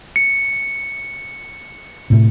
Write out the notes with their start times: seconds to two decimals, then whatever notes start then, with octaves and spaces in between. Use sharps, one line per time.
0.16 C#7
2.10 A2 C3